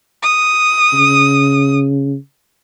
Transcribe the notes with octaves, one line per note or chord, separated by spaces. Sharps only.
D#6
C#3